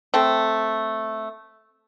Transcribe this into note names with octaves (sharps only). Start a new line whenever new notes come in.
A3 C4